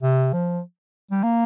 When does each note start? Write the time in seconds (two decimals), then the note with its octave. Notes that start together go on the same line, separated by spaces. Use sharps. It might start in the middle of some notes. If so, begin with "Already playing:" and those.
0.03 C3
0.33 F3
1.11 G3
1.23 A#3